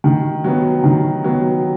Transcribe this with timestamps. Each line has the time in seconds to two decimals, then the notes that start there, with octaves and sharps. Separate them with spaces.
0.04 D#3
0.44 F#3 B3
0.84 D#3
1.24 F#3 B3